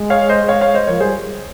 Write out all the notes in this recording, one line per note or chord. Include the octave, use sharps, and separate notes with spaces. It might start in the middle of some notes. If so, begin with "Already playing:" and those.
Already playing: G#3
C#5 F5
C5 D#5
C#5 F5
C#5 F5
C5 D#5
F3 A#4 C#5
G3 G#4 C5